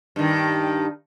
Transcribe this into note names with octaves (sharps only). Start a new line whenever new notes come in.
G2 D#3